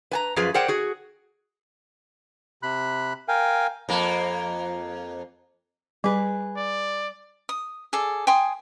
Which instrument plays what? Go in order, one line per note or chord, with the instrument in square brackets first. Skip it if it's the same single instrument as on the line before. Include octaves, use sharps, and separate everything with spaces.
[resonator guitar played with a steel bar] B4 G#5 A#5
F#2 F3 F4 G#4 B4
G#4 A#4 C5 D5 F#5 G5
F#4 G#4
[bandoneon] C3 B5 F#6
A#4 F5 G5 G#5
[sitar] F2 A#3
[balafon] G3 [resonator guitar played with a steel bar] G#4 B4
[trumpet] D5
[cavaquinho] D#6
G#4 A4 D5
G5 G#5 C6 D#6